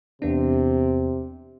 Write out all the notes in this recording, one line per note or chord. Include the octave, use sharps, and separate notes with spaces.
E2 C3 B3 D4